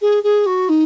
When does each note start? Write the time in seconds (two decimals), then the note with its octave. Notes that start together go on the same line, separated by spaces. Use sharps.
0.01 G#4
0.23 G#4
0.46 F#4
0.69 D#4